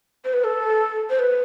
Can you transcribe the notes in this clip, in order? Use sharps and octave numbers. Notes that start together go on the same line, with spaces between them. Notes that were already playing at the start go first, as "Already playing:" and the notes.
C5
B4
A4
C5
B4